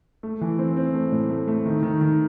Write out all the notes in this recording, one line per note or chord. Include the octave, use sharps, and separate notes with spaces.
A3
E3
C4
C4
A3
A2
A3
A3
D#3
D#3
D#3